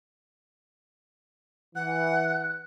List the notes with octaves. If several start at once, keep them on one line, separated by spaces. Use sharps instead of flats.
E3 F#5 F#6